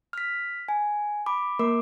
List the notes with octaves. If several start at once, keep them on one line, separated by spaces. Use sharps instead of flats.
F6 B6
G#5
B5 D6
A#3 A#4 D6